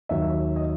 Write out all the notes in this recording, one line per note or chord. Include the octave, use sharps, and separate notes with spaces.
D#2 D#3 F#3 E5
D#5